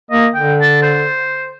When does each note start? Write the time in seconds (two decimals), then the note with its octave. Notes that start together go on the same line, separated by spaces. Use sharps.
0.11 A#3 D#5
0.35 D3 G5
0.61 A5
0.83 C5